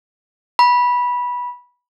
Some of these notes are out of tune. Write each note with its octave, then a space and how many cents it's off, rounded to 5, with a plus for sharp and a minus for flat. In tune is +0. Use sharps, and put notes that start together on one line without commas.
B5 -15